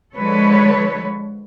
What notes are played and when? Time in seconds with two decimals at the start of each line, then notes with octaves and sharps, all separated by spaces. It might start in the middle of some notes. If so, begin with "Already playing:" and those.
0.15 D3 F3 G#3 A4 B4 C#5